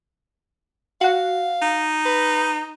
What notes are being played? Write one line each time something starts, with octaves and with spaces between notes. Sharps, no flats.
F#4 F5 F#5
D#4
B4